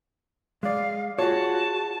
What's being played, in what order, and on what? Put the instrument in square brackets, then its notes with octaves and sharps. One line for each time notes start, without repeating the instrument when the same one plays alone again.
[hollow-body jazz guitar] G#3 D5 [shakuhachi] F5
[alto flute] F4 [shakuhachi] F#4 [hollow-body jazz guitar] G#4 C#5 [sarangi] A5